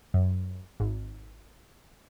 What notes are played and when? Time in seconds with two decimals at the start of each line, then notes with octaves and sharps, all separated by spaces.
0.14 F#2
0.80 G#1